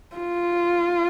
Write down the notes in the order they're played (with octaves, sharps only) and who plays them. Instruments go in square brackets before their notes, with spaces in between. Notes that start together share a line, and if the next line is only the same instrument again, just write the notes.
[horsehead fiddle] F4